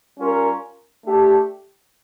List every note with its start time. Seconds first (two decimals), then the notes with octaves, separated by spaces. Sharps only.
0.18 G3 C#4 F4 A#4
1.05 A3 D4 G4